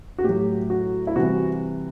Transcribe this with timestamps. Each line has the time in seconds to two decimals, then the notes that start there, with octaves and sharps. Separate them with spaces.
0.18 F#4
0.24 A2 F#3 G4
0.70 F#4
1.07 E4
1.16 C3 E3 G3 F#4